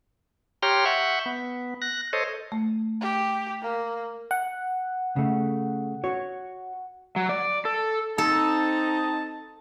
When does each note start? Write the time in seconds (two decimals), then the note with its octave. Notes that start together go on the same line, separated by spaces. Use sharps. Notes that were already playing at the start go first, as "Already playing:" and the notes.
0.63 G4 C#5 G5 A#5 C6 F6
0.85 E5 F#5 C#6 G6
1.26 B3
1.82 F#6 A#6
2.13 A4 C5 C#5 D#5
2.52 A3
3.01 G4
3.62 A#3
4.31 F#5
5.16 C#3 A3
6.04 F#4 C#5
7.16 F#3
7.29 D5
7.65 A4
8.18 C4 D#4 A4 A5